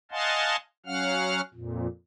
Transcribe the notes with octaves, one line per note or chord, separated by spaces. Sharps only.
D#5 F5 F#5 G#5 A5 C6
F#3 C#4 F5 F#5 F6
F2 A#2